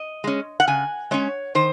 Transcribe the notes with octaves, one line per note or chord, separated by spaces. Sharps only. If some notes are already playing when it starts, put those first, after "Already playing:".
Already playing: D#5
G#3 C#4
F#5
C#3 G#5
G#3 C#4 C#5
D#3 C5